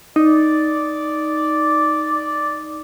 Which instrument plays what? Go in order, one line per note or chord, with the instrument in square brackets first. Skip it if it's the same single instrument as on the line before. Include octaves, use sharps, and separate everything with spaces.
[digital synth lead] D#4 [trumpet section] D5